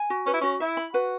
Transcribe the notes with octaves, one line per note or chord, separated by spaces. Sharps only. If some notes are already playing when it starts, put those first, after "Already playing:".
Already playing: G#5
F#4
C#4 B4
E4
C#4 F#4
E4 E5
B5
F#4 B4